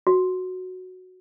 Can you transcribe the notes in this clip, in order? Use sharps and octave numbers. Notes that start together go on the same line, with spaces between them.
F#4